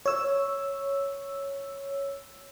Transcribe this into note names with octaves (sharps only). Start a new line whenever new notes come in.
C#5 E6